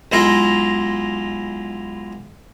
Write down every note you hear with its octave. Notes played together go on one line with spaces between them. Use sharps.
B1 G#3 E4 F4 F5 A#5